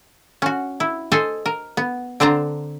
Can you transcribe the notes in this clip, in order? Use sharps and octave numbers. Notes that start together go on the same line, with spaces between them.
C#4 F#4
E4
A4 C5 D#5 G#5
A#4
B3
D3 C4 C5 A5 A#5